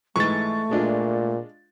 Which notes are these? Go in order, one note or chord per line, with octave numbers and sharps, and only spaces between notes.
G#2 E3 G#3 A3 C#6 A6
A#2 G#3 D4 F4